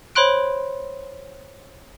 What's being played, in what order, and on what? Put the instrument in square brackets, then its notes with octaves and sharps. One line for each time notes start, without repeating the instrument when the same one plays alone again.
[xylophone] C5 C#5 B5 C6 F#6 D7